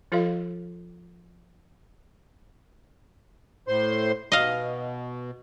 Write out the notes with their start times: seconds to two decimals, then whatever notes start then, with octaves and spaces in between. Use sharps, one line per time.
0.12 F3 F4 A4 D#5 F5
3.68 A2 C5 C6
4.32 B2 D#5 F5